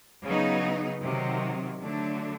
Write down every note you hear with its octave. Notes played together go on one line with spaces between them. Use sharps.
C#3 F#3 B3 D#4
C3 D#3 F#3
D3 F#3 A3 D4